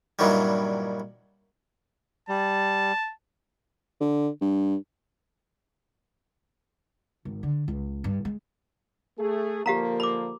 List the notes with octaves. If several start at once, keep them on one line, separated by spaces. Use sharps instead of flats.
G2 A#2 D#3 E3 F#3 G3
G3 A5
D3
G2
G#1
D3
C#2
G2
G#3
A3 G#4
D3 F3 A#3 G4 F5 A#5
B5 D6